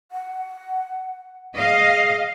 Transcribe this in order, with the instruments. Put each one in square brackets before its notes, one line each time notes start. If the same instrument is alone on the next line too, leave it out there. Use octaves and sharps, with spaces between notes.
[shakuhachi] F#5
[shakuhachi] G#4 [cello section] D#5 F5